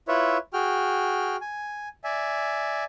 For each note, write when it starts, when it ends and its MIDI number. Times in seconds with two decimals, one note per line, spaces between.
0.08 0.37 64
0.08 0.37 65
0.08 0.37 71
0.08 0.37 73
0.08 0.37 76
0.53 1.36 66
0.53 1.36 68
0.53 1.36 79
0.53 1.36 89
1.41 1.89 80
2.04 2.84 74
2.04 2.84 76
2.04 2.84 80